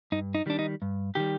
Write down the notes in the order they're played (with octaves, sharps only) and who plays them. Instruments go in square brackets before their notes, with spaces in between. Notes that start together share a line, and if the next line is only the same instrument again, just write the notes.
[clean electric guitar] G2 D#4
D#4
D#3 G3 D4
D#4
G2
D#3 G3 G4